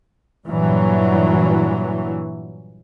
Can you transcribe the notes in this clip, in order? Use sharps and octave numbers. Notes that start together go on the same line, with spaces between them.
G2 A#2 E3 F#3